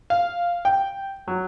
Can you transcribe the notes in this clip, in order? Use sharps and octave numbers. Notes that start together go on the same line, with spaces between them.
F5
G5
F#3